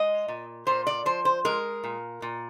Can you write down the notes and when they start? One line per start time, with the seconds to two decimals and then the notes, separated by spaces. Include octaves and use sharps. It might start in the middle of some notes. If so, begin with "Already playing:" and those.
Already playing: G#3 D#5
0.28 A#2
0.67 A#2 C5
0.87 D5
1.05 F3 C5
1.25 C5
1.45 G#3 A#4
1.84 A#2
2.22 A#2